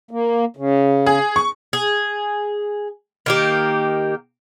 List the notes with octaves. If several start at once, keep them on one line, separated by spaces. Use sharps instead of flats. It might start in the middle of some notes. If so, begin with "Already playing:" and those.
A#3
C#3
G#4
C#6
G#4
D#3 A#3 G4